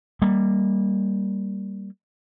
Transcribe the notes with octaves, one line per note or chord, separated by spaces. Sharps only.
G3 A#3